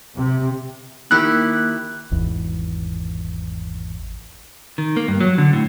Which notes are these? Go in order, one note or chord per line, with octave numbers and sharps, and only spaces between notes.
C3
D#3 A#3 E4 G4 F#6
G#1 E2
D#3
A#3
G2
F#3
D3
A2